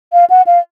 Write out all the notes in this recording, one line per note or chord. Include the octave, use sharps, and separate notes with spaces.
F5
F#5
F5